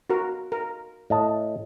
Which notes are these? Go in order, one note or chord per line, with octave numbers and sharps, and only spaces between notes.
F#4 A#4
A#4
A2 D#5 A5